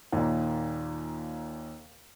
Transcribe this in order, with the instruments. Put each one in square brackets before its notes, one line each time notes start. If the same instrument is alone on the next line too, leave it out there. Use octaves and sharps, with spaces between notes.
[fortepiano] D#2 A#2